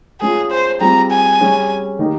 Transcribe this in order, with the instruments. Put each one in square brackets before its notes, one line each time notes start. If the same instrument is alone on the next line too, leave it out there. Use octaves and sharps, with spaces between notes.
[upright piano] G#3 C#4 F4 [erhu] G#4
[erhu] C5
[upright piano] G3 C4 F4 G#4 [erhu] A#5
[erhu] G#5
[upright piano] G3 C#4 G#4
D#3 A#3 D#4 G4